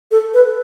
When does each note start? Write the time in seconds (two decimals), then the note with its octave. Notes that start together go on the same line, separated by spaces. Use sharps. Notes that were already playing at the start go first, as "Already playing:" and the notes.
0.11 A4
0.34 B4